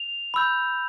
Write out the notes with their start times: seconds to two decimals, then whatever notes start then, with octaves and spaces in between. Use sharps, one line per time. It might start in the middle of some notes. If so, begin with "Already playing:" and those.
Already playing: F7
0.34 B5 E6 G6